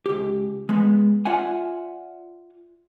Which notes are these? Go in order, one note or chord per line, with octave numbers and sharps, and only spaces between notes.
C#2 G4
G#3 B3
F4 D5 E5 F#5 G#5